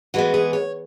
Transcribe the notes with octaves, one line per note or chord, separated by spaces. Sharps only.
E3 G#3 B3 F#4
G#4
C#5